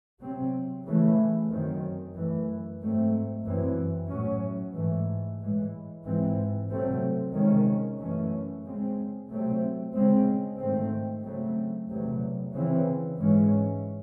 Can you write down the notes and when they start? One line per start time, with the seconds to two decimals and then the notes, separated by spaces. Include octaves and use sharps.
0.20 C3 F#3 C4
0.84 C#3 E3 A3
1.50 F#2 D#3 F#3 C4
2.14 F#2 E3 A3
2.80 G#2 F#3 A3 C4
3.44 F#2 E3 C4
4.09 A2 F#3 C#4
4.75 G#2 E3 A3
5.40 A2 E3 G#3
6.04 G#2 E3 C4
6.69 C3 F#3 A3 C4
7.34 C3 D#3 G#3 C#4
7.99 F#2 E3 A3 C#4
8.64 C#3 G#3 C4
9.29 C3 F#3 A3 C4
9.94 C#3 G#3 C4
10.59 G#2 D#3 A3 C4
11.24 C#3 F#3 A3 C4
11.89 E2 C3 F#3 A3
12.53 C#3 E3 C4
13.19 G#2 E3 G#3 C#4